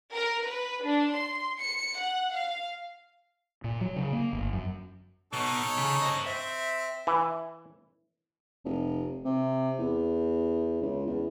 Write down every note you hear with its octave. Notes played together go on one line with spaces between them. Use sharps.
A#4
B4
D4
C6
C#7
F#5
F5
A#2
F#3
C#3
A#3
G1
F#2
B2 D#4 A4 C#5
C#3
C5 D#5
C4 E5
E3
F1
C3
E2
C#2
E2